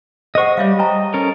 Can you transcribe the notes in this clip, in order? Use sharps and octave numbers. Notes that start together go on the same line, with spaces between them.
G#4 C5 D#5 F#5 C#6
G3 C#5 E5 F5
D#5 G5 A5 A#5
C#4 A4 A#4